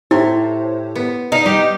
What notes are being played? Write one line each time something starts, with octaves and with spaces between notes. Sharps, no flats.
A2 E4 G4 C5 C#5
B3
D#4 F5
G3 G4